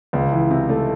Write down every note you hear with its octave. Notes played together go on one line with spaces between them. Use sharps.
C#2
E3
C3
A3